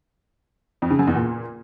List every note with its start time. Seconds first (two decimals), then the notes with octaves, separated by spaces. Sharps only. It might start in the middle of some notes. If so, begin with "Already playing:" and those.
0.82 F2
0.91 C#3
0.99 F#2
1.07 E2
1.16 A#2